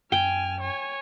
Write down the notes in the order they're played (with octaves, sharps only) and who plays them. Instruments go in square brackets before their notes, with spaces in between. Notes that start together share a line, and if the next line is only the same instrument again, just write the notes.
[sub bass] F#2 [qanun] G5 [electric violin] G#5 F6
[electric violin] C#5 G#5